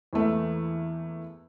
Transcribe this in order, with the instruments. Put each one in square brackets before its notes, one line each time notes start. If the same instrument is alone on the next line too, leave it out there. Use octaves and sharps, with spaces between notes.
[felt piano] E2 E3 A3 A#3